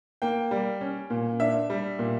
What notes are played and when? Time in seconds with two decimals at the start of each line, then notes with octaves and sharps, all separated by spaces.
0.22 A#3 G5
0.51 G3
0.81 C#4
1.10 A#2
1.40 D4 E5
1.70 G3
1.99 A#2